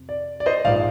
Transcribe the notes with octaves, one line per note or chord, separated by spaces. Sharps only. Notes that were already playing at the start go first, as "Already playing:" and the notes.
Already playing: F2 C3
D5
D5
C5 D#5
A#1 G#2 F3 G#3 D5 F5